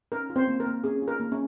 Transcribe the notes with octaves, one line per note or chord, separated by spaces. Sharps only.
C#4 A#4
F4
C4 C5
A#3
A#4
A#3
C#4 G#4
F4
A#4
A#3
C#4